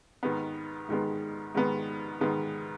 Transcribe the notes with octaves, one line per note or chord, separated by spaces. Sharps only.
G#2 D#3 G#3 B3
G#2 D#3 G#3 B3
G#2 D#3 G#3 B3
G#2 D#3 G#3 B3